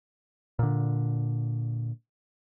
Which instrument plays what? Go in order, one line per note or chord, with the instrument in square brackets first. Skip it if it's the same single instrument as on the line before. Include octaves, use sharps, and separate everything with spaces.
[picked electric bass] A#2 D3